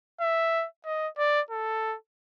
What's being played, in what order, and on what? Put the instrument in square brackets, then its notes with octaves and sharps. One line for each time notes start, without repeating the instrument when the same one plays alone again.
[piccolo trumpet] E5
D#5
D5
A4